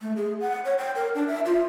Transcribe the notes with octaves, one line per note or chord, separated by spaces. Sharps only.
A3
G#4
F#5
C#5
G5
A#4
D4
E5
F4